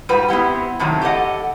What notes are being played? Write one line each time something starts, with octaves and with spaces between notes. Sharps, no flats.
G#2 G3 F4 F#4 B4
B3 C4 E4 G4
A2 C3 D#3 F#3
G4 A4 D5 D#5 F#5